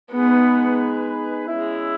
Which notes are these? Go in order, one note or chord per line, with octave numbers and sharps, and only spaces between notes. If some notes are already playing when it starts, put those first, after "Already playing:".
G#3 B3 D#4 G#4 B4
G#3 C#4 E4